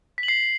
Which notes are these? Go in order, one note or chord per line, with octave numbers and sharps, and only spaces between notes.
B6
F#7
C7